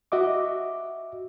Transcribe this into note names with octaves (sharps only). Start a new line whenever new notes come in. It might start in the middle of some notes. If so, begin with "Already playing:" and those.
F#4 D#5 E5 D6